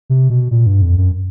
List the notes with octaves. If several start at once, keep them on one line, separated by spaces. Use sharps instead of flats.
C3
B2
A#2
G2
F2
F#2